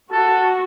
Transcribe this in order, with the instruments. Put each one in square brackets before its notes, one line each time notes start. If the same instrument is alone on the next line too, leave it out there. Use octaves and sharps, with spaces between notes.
[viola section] F#4 [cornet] A4